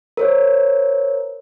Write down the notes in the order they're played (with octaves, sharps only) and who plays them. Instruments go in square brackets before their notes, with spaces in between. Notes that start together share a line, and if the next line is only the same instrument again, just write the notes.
[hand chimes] A#4 C5 C#5